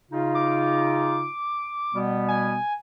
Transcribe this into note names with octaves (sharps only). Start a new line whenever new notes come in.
C#3 D#4 F4
D6
B2 G3 B3
G#5